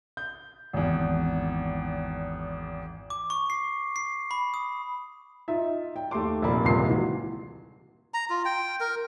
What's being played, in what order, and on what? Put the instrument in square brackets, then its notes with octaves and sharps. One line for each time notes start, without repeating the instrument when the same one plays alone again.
[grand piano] G6
G#1 E2
[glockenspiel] D6
C#6
C7
C7
B5
D#6
[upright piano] D#4 F4 E5
G5
D#2 A3 G4 C6 D6
A#1 C3 A#3 B5
D#1 C#2 C3 C6 C7
E3 F#4
[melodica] A#5
F4
G5
A#4